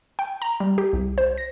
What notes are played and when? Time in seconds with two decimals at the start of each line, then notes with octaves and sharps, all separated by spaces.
0.19 G5
0.42 A#5
0.60 G3
0.78 G4
0.93 C2
1.18 C5
1.38 A#6